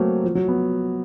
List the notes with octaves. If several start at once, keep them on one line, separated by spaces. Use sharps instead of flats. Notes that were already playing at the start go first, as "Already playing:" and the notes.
Already playing: F#3 A3 A#3 C4
F3
F#3
B3